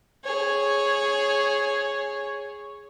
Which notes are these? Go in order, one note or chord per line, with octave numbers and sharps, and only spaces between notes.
G#4 C#5